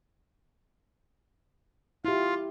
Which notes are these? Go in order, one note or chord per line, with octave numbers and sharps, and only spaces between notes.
E4 F4 G4